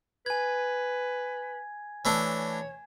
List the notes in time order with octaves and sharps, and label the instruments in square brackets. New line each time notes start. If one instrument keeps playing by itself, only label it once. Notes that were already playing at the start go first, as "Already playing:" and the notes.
[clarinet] B4 [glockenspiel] G#5 G#6
[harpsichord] E3 A3 D4 [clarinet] C#5